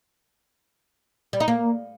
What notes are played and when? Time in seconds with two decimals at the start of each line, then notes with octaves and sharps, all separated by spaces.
1.33 G3
1.40 D#4
1.48 A#3